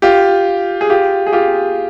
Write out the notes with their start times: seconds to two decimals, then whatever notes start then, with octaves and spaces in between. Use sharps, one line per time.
0.02 F4 G4
0.81 G#4
0.90 F4 G4
1.27 G#4
1.33 F4 G4